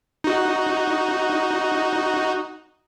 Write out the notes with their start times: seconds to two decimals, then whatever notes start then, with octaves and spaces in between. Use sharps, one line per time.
0.24 D#4 F#4